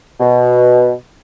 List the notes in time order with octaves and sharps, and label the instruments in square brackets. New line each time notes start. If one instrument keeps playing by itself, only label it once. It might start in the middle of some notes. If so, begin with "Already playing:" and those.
[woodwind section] B2